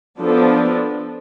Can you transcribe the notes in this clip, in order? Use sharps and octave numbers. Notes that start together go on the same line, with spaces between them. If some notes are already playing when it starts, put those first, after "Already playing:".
F3 B3 D4 A4